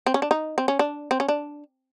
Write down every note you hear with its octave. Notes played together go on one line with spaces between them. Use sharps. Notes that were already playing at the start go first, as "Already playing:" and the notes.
C4
C#4
D4
D#4
C4
C#4
D4
C4
C#4
D4